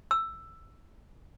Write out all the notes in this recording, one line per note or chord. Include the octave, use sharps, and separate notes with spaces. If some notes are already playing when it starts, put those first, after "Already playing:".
E6